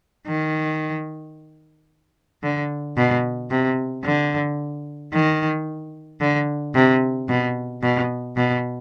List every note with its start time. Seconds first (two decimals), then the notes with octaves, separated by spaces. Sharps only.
0.28 D#3
2.43 D3
2.97 B2
3.51 C3
4.04 D3
5.13 D#3
6.21 D3
6.75 C3
7.29 B2
7.83 B2
8.37 B2